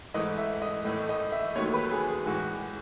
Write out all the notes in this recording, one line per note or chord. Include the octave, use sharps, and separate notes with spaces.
G#2 E3 A3 D#5
E5
D#5
A2 E3 A3 D#5
D#5
E5
D#2 D#3 F#3 A3 C#5
B4
G#4
G#4
A2 E3 G#3 F#4